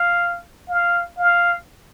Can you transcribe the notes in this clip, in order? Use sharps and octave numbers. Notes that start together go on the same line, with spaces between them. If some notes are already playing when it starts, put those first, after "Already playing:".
Already playing: F5
F5
F5